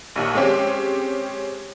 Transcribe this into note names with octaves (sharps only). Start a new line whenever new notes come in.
A#1 D#2
G#3 C4 C#4 G4